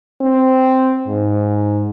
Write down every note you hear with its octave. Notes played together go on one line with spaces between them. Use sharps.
C4
G#2